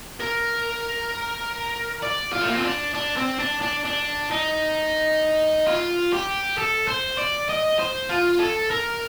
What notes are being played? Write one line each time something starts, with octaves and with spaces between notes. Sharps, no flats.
A#4
D5
F4
A3
A#3
C4
D4
D4
C4
D4
D4
D4
D#4
F4
G4
A4
C5
D5
D#5
C5
F4
A4
A#4